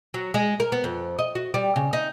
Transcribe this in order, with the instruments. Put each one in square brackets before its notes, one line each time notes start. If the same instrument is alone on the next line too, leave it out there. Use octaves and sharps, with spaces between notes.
[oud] F#3
G#3
A#4
B3
F2
D#5
F#4
G3
C#3
D#4